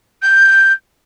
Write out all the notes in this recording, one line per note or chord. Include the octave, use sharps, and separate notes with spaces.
G6